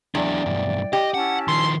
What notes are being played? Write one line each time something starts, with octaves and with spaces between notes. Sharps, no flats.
E2 F#3 D4 D5 G5
B1 G2
G4 D#5
C#4 E4 F#5 A5
D#3 F3 C6